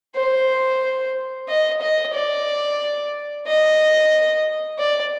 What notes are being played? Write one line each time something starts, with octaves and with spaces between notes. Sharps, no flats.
C5
D#5
D#5
D5
D#5
D5